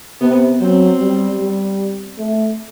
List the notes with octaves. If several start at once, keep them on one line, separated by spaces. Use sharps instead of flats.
C3 B3
F#3 C4
G3
G3
A3